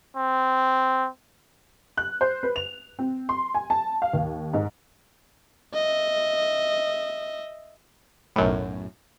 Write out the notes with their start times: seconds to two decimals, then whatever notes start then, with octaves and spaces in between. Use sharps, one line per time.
0.16 C4
1.97 F#6
2.21 C5
2.43 B4
2.56 F7
2.99 C4
3.29 C6
3.54 G#5
3.70 A5
4.02 F5
4.13 D#2
4.54 G#2
5.74 D#5 E5
8.36 B1 F#2 A2